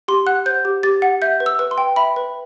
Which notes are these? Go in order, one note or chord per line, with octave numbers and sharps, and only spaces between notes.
G4 C6
F#5 F#6
C5 G6
G4
G4 A6
F#5
E5 G6
B4
E6
B4
C6
G5
E5 B5
B4